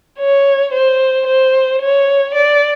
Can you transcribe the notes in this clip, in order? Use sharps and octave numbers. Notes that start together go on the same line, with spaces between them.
C#5
C5
C5
C#5
D5